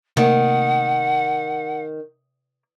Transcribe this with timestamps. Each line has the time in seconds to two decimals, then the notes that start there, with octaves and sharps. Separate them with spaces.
0.17 C3 D#3 A3 A#3 F#5